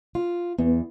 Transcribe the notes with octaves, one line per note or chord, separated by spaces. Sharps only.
F4
E2 B3